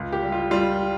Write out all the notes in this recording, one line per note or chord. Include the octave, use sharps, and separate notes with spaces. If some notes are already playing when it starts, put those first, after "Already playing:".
Already playing: C#2 F4
G4
G3
F4
G3 F4